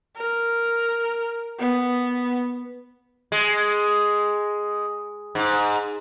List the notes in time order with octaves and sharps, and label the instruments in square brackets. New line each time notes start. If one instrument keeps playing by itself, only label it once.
[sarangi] A#4
B3
[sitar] G#3
G#2